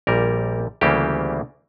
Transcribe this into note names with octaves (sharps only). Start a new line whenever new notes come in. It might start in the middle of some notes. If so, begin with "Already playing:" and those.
A#1 A#2 G3 A#4
D2 C#3 E3 G3 A#3 G4